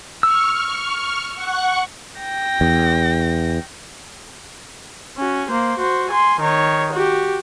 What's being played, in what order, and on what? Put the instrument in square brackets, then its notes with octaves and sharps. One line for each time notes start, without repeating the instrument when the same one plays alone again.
[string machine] C#6 F6 [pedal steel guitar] E6
[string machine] F#5 C#6 F#6
[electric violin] G5 A#6
[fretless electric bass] E2
[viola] C#4 F#4
A#3 C5
F#4 C5
G#5 C6
D#3 C#5
F#4 G4